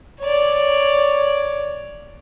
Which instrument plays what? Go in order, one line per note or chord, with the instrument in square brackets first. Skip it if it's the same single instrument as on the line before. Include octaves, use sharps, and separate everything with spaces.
[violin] C#5 D5